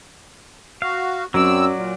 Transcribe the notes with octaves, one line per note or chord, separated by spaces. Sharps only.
F#4 F5
F#2 F#3 C4 D5 E6
A#2